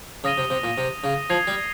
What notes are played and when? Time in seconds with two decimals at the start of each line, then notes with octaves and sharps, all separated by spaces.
0.24 C#3 D#6 A#6 D#7 G7
0.38 C3
0.50 C3
0.64 A#2
0.78 C3
1.04 C#3
1.30 F3 G#6 C7 F7
1.47 G3